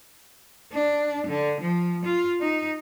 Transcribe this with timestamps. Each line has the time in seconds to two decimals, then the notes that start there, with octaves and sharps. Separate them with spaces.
0.72 D4
1.27 D3
1.61 F3
2.05 F4
2.40 D#4